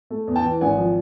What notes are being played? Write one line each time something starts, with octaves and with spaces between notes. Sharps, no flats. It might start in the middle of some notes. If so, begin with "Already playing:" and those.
A3
E2
G5 A5
E3
G#1 F#5 G#5
F3